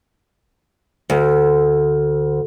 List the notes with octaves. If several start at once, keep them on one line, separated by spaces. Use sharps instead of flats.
D2